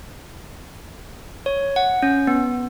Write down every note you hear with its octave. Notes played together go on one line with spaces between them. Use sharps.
C#5
F#5
C#4
B3